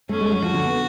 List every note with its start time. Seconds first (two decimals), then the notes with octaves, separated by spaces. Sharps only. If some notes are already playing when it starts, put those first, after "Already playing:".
0.09 A3 C#4
0.21 G#3
0.32 F#3
0.43 F3 F#4
0.54 D3
0.65 B3